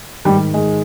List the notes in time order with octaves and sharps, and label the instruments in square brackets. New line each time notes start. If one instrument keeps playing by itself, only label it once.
[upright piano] G#2 D#3 G3
G#3